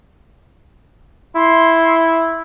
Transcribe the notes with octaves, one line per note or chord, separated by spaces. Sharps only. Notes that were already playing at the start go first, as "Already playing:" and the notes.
E4 C6